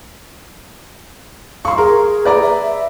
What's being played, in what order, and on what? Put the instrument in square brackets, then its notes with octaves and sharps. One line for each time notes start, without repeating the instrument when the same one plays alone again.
[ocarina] F5 [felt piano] C6 C#6
[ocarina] G#4 [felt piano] A#4
[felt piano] B4 D5 A#5
[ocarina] E5